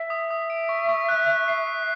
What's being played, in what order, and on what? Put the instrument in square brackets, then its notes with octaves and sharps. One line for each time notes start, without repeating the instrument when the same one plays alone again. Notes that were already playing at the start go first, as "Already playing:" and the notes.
Already playing: [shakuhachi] E5
[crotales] D#6
D#6
D7
C#6
C#6
F#6
F#6
C7
C7